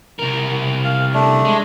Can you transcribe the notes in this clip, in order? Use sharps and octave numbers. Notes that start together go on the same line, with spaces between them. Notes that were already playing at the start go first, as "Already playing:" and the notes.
C2 A#4
F5
A3 D4
G#3